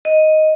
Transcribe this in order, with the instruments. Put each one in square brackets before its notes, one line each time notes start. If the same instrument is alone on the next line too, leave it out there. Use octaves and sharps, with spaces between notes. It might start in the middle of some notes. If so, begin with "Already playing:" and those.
[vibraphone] D#5